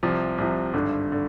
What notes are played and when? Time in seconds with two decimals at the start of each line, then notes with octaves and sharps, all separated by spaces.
0.03 C2 C3 F3
0.38 C2 C3 F3
0.73 G#1 G2 D3
1.12 D3